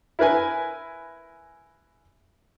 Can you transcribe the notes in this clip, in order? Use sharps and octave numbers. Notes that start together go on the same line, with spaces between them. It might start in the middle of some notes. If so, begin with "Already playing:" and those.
E4 A#4 B4 G#5